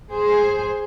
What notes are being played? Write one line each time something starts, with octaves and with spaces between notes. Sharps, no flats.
G#4 C5